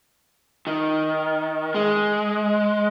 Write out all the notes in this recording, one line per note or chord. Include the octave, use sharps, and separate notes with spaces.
D#3
G#3